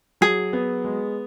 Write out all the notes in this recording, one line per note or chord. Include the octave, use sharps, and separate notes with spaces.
F#3 G#4
B3
G#3